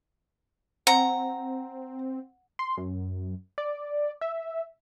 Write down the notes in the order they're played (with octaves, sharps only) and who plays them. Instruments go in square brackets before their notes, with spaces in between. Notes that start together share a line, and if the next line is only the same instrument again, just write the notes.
[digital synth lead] C4 [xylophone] F#5 [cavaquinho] A#5
[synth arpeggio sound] C6
F#2
D5
E5